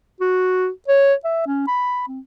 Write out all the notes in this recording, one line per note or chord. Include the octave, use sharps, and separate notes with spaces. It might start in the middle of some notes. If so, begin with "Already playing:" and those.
F#4
C#5
E5
C#4
B5
C4